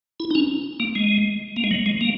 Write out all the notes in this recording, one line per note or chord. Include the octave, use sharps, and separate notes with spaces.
E4
D#4
C#4
A#3
G#3
A#3
G#3
F#3
G#3
A#3